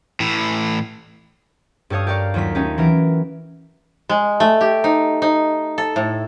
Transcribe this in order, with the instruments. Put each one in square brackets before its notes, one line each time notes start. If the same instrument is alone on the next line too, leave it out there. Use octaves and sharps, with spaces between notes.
[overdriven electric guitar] A2 E3
[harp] G2 G4 A4 C#5 F5 D#6
G4 A#4 D5 F5 C#6 F6
D#2 F#3 F4 A#4 B6
A3 C#4 D#4 G4
E3 F#3 A#4 B6 D7
[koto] G#3
A3
G4
D#4
D#4
A4
A2